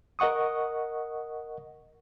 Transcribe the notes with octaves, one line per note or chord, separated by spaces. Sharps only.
A#4 D#5 F#5 C#6 D#6